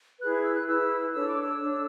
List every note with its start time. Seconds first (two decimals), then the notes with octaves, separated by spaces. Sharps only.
0.20 E4 G#4 B4 F#6
0.43 E6
0.55 F#6
0.67 E4 G#4 B4 E6
1.14 D4 A4 C#5 E6
1.28 D6
1.41 E6
1.61 D4 A4 C#5